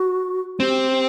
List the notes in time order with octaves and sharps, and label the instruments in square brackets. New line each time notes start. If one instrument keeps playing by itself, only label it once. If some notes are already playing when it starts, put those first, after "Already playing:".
Already playing: [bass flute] F#4
[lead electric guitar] C4 [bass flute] G4
[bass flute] G4